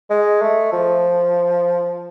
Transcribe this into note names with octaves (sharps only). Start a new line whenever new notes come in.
G#3
A3
F3